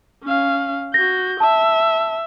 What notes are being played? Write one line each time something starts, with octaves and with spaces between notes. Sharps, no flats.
C#4 F5
F#4 G6 A#6
E5 A5